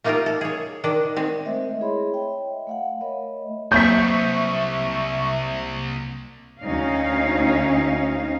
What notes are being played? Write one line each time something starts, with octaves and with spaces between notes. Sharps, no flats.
A3 A#3 D#4 F4 G4 A#4
A4
G#4 C#5
D#3 D4 A4 D5
D#3 G#3 C4
G#3 A3 C4 C5 D#5 E5
E4 G#4 C#5 E5 B5 C6
C#5 D#5 E5 G5
A3 F5 F#5
A3 A#4 C#5 D#5 E5 B5
C2 F#3 A#3 E5 C#6 G6 B6
D2 C#4 D#4 F5